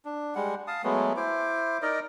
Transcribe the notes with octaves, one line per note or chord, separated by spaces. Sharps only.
D4
G3 G#3 F#5
F5 A5 D#6
F#3 G#3 A3 B3
E4 C5 D6
D#4 A#4 D5 D#5